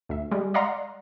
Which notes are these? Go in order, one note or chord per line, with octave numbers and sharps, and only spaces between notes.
D2 E5
G3 G#3
D5 D#5 F5 F#5 A#5 C6